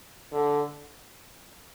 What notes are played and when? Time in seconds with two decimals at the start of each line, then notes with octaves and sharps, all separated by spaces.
0.33 D3